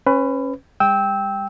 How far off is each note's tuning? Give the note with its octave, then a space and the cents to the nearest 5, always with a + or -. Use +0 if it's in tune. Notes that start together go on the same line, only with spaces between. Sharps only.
C#4 -20 B4 +20
G3 +45 G5 +0 E6 -20